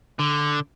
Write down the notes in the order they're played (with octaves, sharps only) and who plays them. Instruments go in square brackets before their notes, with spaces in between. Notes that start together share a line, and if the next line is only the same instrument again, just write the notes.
[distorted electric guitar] D3